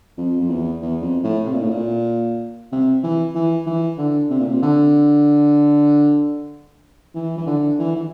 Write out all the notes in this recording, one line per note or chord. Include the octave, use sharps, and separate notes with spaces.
F2
F2
E2
E2
F2
A2
C3
A#2
A2
A#2
C3
E3
E3
E3
D3
C3
A#2
C3
D3
E3
E3
D3
E3
E3